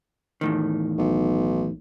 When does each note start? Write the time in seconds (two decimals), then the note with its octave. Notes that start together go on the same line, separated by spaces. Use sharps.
0.41 E2 A2 D#3
0.98 B1